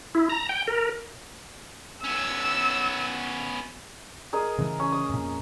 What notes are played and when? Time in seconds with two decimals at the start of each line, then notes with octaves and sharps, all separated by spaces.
0.15 E4
0.30 A#5
0.49 G5
0.67 A#4
2.04 B3 C#4 E6
4.33 G#4 A#4 D#5
4.58 C#3 E3 A3
4.80 C#4
4.92 D#6
5.09 F2 A#2